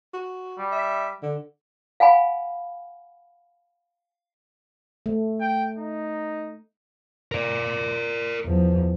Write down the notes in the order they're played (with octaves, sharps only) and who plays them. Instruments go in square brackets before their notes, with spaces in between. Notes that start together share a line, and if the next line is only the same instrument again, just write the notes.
[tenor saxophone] F#4
[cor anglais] G3
[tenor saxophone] E5
D3
[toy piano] F5 F#5 G#5 B5
[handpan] A3
[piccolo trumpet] G5
D#4
[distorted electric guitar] A#4 D5
[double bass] E2 F3